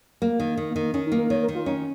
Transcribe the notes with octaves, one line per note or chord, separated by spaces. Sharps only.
A#3
D#3
D#3
A#3
D#3
A#3
D#3 C#4
D#4
A#3
A#4
D#3 C#5
A#4
D#3
F4
C#4 D#4